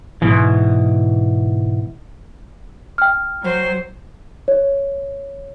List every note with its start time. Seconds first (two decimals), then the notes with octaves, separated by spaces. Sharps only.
0.22 G#2 B2 E3
2.98 G5 F6
3.41 F#3 C5
4.48 C#5